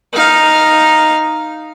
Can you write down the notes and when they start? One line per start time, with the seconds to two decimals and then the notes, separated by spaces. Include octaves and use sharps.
0.13 D#4 F5